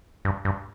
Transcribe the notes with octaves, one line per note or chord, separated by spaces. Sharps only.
G2
G2